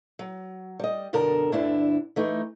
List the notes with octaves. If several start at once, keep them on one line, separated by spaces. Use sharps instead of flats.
F#3
G3 D#5
F#2 B2 D3 A4 A#4
D2 G2 D3 D4 E4
E3 A3 D#4